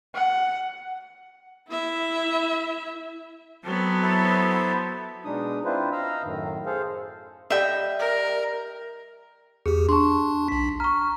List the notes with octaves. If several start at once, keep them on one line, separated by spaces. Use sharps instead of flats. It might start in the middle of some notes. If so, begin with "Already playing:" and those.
F#5
E4 E5
F#3 B3 C4 A4
E4 A4 C5
B2 G#3 D4 D#4 D#6
C4 D4 E4 F4 B4 C5
D#5 F5 A#5 E6
F#2 A2 D#3
G#4 A4 C5 F5
G3 D#5 E5 G5
A#4
E2 G4 G#4
D4 A5 C6 C#6
B1 B6
A#5 C#6 F6